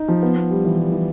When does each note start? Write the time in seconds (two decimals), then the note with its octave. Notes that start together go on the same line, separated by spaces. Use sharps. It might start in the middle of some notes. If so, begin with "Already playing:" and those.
Already playing: D#4
0.08 F3
0.23 B3
0.36 B3
0.50 G3
0.65 E3
0.78 G3
0.92 E3